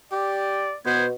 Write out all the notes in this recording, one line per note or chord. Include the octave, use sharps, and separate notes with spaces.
G4 D5
B2 B3 C5 G#6